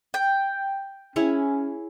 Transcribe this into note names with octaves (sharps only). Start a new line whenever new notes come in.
G5
C#4 E4 G#4 C#5